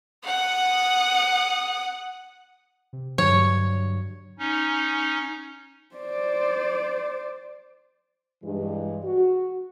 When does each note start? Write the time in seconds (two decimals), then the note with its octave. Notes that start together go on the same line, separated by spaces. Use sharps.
0.25 F#5 D#6
2.93 C3
3.18 G2 D3 F#3 C#5
4.39 C#4 D#4
5.96 C5 D5
8.43 G2 E3 G#3
9.04 F#4